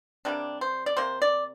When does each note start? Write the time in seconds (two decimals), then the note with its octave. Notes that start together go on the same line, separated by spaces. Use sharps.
0.25 C3 G3 A#3 D4
0.61 C5
0.86 D5
0.97 C3 A#3 C5
1.22 D5